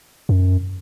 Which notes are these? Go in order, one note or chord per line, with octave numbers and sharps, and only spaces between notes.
F#2